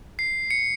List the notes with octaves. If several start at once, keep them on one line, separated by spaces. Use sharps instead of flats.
C7
C#7